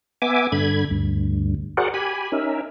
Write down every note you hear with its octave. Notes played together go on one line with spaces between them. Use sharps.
B3 E5 G#5 D6
G2 D3 B5 G#6
D2 G2
F#4 G#4 A#4 C5 D5 F#5
G4 G#5 B5
C#4 D#4 A#4 E5